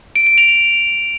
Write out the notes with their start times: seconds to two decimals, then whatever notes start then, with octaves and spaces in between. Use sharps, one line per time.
0.16 D7
0.27 D7
0.38 F7